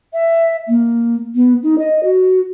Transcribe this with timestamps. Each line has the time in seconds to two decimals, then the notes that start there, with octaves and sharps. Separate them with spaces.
0.13 E5
0.68 A#3
1.35 B3
1.63 D#4
1.78 D#5
2.04 F#4